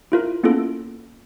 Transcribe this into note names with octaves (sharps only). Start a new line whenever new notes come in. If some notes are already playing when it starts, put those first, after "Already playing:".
E4 F4 A#4
A#3 B3 C#4 E4 F4 A4